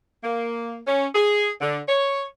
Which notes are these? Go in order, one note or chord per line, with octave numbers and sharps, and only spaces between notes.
A#3
C#4
G#4
D3
C#5